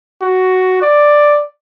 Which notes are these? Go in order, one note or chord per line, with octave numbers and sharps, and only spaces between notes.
F#4
D5